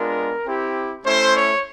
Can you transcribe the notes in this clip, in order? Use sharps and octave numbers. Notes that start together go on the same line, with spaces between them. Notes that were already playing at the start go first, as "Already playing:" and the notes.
Already playing: G#3 B3 D4 F4 A#4
C4 E4 G4
A3 C#4 E4 C5
C#5